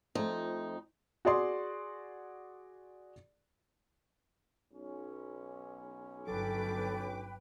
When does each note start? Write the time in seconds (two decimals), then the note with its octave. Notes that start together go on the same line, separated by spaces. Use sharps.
0.15 F2 F3 A3 D#4
1.25 F#4 G#4 D5 C6
4.74 B1 C#4
6.28 G1 F#3 A4 B4 G5 D6